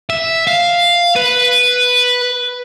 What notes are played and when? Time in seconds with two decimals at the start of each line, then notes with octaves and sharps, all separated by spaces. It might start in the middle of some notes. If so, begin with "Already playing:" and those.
0.10 E5
0.47 F5
1.16 B4